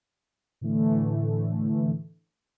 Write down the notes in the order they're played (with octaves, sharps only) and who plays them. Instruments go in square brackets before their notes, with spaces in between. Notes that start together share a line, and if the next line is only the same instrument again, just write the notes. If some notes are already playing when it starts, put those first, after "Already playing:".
[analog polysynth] A2 D3 E3 A3